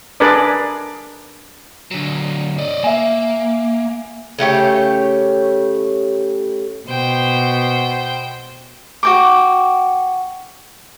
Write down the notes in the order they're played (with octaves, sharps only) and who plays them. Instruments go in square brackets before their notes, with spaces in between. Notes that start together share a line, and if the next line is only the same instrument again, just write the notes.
[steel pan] D4 G#4 A#4 B4 D5
[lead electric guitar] D3 F#3
D5 D#5
[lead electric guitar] A#3 [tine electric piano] E5 G#5
[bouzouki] C#3 A3 G4 C#5
[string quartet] B2 [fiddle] C5 G5
[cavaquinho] F#4 G5 D6